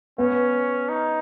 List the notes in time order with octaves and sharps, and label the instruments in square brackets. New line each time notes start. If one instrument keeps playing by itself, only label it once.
[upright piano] B3 [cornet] C#4
[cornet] D#4